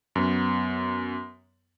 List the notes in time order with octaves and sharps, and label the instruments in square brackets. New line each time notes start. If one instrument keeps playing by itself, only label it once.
[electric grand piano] F#2 B3